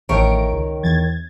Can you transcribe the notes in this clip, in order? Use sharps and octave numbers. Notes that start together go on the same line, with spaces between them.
A1 D#3 A3 A#4 C#5 D7
C#2
E2 G#6 A6